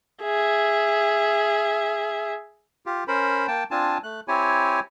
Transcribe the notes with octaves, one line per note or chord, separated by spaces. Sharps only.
G#4 E5
F4 G4
C#4 A#4 C5 B5
A#3 G5 A5
C4 D4 F4 G#5 A5
A3 F#6
C4 E4 G4 C#5 G#5